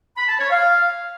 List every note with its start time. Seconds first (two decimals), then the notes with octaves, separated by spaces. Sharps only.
0.16 B5
0.27 A5
0.39 C#5
0.50 F5